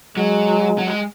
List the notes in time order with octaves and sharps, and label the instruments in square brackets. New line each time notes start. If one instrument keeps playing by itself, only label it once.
[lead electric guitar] F#3 [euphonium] G#3
[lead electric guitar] F#3
G#3